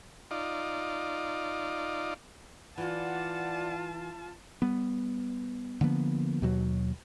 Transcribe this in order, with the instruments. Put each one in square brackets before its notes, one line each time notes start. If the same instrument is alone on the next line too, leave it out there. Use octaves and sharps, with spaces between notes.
[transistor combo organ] D#4 F4 D5
[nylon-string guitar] E3 [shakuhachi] F4 [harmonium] D5 F#5 [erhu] A5
[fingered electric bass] G3 B3
D3 F3 A#3 B3
D#2 B2 F#3